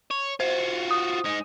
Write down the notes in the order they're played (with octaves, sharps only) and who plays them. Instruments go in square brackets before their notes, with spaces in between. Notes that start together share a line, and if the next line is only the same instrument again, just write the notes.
[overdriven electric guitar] C#5
[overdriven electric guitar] F4 F#4 [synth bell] C5
[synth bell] D#6
[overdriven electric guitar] G#3 D#4